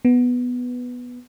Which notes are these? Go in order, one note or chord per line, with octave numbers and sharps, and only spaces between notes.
B3